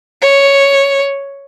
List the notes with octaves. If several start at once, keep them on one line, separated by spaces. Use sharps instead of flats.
C#5